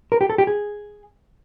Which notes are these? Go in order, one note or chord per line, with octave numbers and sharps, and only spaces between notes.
A#4
G4
A4
G4
G#4